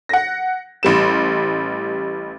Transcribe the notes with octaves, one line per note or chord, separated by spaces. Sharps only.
F#5 A#6
A1 G3 E7